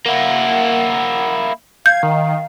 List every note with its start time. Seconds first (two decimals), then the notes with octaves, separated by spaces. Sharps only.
0.06 A#3 E4 F#5
1.86 F5 G6 G#6
2.03 D#3